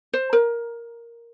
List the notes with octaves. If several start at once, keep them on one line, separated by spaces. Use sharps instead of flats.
C5
A#4